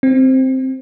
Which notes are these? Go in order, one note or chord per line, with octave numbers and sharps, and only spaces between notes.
C4